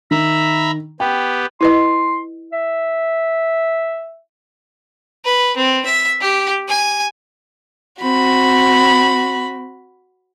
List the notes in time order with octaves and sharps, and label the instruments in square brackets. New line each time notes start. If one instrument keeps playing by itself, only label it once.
[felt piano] D#3 [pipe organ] E5 A#5 B5
[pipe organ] B3 G4 [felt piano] G5
[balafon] E4 B4 D#5 [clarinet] C6
[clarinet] E5
[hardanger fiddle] B4
C4
E5
G4
G#5
[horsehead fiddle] C4 [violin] F#4 B5